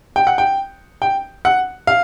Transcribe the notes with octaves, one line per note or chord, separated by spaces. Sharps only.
G5
F#5
G5
G5
F#5
F5